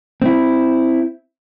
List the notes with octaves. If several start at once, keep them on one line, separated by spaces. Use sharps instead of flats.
C4 E4